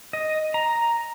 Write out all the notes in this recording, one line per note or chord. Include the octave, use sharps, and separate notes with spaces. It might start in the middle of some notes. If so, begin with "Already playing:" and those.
D#5
A#5